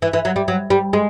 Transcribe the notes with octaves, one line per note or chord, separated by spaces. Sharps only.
E3
E3
F#3
G3
F#3
G3
G#3